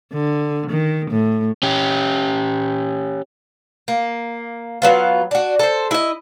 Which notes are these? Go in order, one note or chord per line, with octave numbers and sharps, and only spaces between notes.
D3
D#3
A2
C#4 G4
A#3
F#3 B3 F4
D4 F#4
A4 C5
E4 D#5